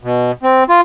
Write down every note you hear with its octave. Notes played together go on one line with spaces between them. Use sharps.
B2
C4
F4